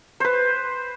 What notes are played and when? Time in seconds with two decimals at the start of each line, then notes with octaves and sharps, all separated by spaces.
0.20 B4 C5